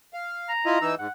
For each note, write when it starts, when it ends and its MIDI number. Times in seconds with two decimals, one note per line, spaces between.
0.13 0.53 77
0.49 0.87 82
0.66 0.79 64
0.66 0.79 65
0.66 0.79 75
0.82 0.95 52
0.82 0.95 63
0.82 0.95 88
0.98 1.07 44
0.98 1.12 78